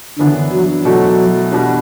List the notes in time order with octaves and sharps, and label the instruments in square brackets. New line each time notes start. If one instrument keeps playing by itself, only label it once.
[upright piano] F#2 E3 B3 D4 [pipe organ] D3
[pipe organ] F#3
[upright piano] B2 A3 E4 A4 D5 [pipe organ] F#3
[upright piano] E2 B2 G3 D4